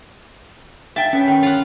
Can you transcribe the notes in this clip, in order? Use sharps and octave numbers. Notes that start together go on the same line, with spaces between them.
E5 G5 A5
B3 C#4
D#3
F4 F#5